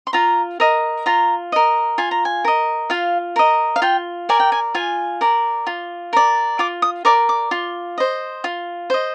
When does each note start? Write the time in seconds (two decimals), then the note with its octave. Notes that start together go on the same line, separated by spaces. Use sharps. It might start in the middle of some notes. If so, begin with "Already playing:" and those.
0.07 C6
0.13 F4 A#5
0.60 A#4 D#5
1.06 F4 A#5
1.52 A#4 D#5
1.98 F4 G#5
2.11 A#5
2.25 G#5
2.45 A#4 D#5
2.90 F4 F5
3.36 A#4 D#5
3.76 F5
3.82 F4 G5
4.29 A#4 D5 G#5
4.40 G5
4.52 G#5
4.75 F4 G#5
5.21 A#4 D5
5.67 F4
6.13 A#4 D5
6.59 F4 D6
6.82 D#6
7.05 A#4 D5 D6
7.29 D6
7.51 F4
7.98 C5 D#5
8.44 F4
8.90 C5 D#5